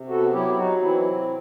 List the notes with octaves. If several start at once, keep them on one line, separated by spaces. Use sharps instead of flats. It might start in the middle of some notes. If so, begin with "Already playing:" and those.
Already playing: C3
B3 F#4 A4
F#3 E4 G4
E4
F#3 D#4 F#4
E3 C4 E4
C3